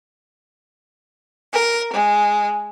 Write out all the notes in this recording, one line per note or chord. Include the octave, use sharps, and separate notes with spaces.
A#4
G#3